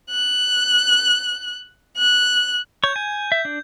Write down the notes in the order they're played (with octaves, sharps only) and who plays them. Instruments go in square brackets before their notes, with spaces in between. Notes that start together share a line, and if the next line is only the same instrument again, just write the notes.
[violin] F#6
F#6
[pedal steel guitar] C#5 C#6 [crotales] G6
[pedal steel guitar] G#5
E5
D4